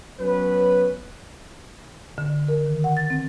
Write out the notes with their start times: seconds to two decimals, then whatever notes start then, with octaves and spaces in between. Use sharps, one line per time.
0.20 F#3 B3 C#4 B4
2.18 D3
2.48 A#4
2.66 D#3
2.84 F#5
2.97 A6
3.10 C4